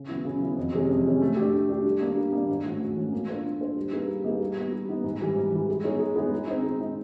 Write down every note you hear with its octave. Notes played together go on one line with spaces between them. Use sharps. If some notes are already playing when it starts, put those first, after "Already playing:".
Already playing: C#3
F#3 B3 E4
C#3
F#3 B3 E4
F2
C3 E3 G#3 C#4
F2
C3 E3 G#3 C#4
A3
D4 G4
A3
D4 G4
G3
A#3 D4
G3
A#3 D4
G#2
E3 A3 C#4 F#4
G#2
E3 A3 C#4 F#4
A#3
D4 F4 A4 C5
A#3
D4 F4 A4 C5
G3
A#3 D#4 G#4 B4
G3
A#3 D#4 G#4 B4
G3
B3 D#4
G3
B3 D#4
G#2
E3 G3
G#2
E3 G3
G#3
B3 D#4 G#4 C#5
G#3
B3 D#4 G#4 C#5
G#3
C4 D#4
G#3
C4 D#4